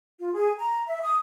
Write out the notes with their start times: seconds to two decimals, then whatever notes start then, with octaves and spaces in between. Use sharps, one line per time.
0.18 F4
0.33 G#4
0.57 A#5
0.86 E5
1.02 D#6